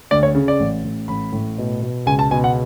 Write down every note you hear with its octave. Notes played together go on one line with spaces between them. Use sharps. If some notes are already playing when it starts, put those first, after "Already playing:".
D2 D5
C#5
C#3
D5
A1
A1
A1 B5
A2
B2
B2
C#2 G#5
A5
B2 G#5
F#5